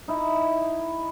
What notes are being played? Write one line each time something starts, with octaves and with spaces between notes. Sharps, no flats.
D#4 E4